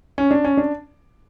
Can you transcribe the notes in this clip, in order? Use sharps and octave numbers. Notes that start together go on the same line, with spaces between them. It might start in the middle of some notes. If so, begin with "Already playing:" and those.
C#4
D4
C#4
D4